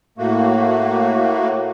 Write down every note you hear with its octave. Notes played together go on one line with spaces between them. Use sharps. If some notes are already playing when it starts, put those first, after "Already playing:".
A2 A3 A#3 F#4